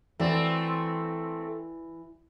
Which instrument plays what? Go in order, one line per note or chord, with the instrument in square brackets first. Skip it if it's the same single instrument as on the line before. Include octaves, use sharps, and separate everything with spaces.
[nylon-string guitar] E3 F#4 D5 [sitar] A3 C4